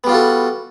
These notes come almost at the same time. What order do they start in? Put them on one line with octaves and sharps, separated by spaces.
B3 G3 F4 F#4 A4